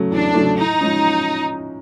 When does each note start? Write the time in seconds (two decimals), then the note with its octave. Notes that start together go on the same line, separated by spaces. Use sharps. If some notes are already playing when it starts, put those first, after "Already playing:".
Already playing: C#3 F#3 A3
0.11 E2 D4
0.34 C#3 F#3 A3
0.58 A2 D#4
0.81 F3 G#3 C#4